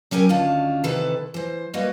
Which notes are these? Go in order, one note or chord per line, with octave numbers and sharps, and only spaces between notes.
F#3 C#4 G4 A#4 G#5
D2 D#3 C#4 D4 F4 A5
C3 D#3 E3 A4 B4 A5
E3 C5
G3 A#3 F#4 B4 D#5